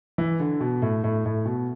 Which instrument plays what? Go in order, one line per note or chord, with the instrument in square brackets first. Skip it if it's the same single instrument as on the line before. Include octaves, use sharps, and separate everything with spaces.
[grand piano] E3
D3
B2
A2
A2
A2
B2